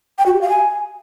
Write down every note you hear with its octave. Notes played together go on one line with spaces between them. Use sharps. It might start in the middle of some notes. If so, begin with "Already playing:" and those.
G5
F#4
G4
F5
G#5